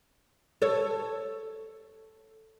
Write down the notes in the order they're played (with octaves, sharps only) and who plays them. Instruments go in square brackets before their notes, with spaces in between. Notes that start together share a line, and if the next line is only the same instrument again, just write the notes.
[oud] A4 C#5